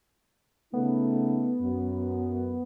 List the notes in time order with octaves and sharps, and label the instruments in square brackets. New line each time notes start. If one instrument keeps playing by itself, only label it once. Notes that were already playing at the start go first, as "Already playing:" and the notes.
[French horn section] C#3 A3 D#4 [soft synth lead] B3
[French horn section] F#2